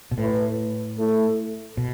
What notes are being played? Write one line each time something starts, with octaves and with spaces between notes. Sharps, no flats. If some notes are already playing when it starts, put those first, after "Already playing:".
B2
A2 A3 E4 B4
A3 E4 A4
B2